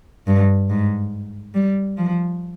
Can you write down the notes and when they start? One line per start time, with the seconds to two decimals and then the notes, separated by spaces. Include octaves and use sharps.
0.27 G2
0.70 G#2
1.55 G3
1.97 F3